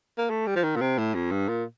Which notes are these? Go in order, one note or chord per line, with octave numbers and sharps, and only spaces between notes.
A#3
A3
G3
F3
D#3
A#2
C3
A2
F2
G2
A#2